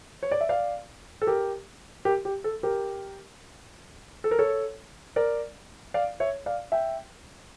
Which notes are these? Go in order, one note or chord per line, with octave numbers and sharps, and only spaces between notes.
C#5
D5
E5
D5 F5
A4
G4 A#4
G4 A#4
G4
A4
G4 A#4
A4
A#4
A4 C#5
A#4 D5
D5 F5
C#5 E5
D5 F5
E5 G5